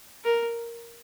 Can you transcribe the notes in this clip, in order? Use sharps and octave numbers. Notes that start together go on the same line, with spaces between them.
A#4